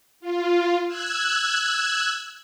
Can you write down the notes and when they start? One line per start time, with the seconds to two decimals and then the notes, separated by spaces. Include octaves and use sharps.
0.20 F4
0.87 E6 F#6 G#6